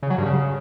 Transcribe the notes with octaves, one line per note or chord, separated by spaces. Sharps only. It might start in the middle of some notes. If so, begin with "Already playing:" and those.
C#3
F#3
G2
C#3